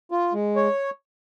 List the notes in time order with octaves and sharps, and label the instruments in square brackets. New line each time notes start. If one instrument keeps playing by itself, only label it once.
[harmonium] F4
G#3
C#5